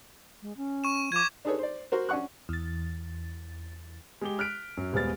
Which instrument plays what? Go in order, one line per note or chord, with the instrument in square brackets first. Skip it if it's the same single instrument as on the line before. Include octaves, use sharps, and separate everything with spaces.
[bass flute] G#3
C#4
[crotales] C#6 E7
[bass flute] F3 [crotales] D6 G#6
[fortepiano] D4 D#4 G#4 A4 B4 C#5
C5 D5
F#4 A#4 C5
C#4 D4 F#5 C#6 F#6
[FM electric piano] E2 A6
[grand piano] G#3 G4 G7
F6 F#6 B6 D7
F#2
D#1 G#3 B3 C5 F6 A6